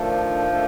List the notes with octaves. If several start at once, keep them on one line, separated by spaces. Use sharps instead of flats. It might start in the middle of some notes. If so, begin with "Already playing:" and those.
Already playing: D#3 F3 A3 D4 A4
D#3 A3 D4 A4